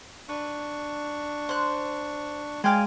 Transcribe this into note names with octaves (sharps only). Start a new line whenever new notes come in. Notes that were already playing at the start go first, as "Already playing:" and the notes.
D4 B4 C#6
C5 F#6
G#3 D5 F5 G5 G#5